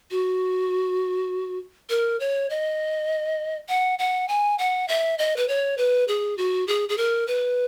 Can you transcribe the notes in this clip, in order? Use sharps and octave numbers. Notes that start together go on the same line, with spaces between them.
F#4
A#4
C#5
D#5
F#5
F#5
G#5
F#5
E5
D#5
B4
C#5
B4
G#4
F#4
G#4
G#4
A#4
B4